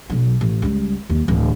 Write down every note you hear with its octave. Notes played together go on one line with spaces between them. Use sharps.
B1 F#3
A1
C#2 G3
D#2
D1 E3